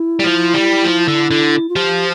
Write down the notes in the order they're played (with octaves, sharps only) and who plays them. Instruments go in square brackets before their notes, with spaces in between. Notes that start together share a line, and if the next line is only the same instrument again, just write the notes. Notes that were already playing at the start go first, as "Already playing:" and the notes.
Already playing: [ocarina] E4
[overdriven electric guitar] G3
F3
G3
F3
D3
D3
[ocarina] F4
[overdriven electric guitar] F3 [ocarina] G4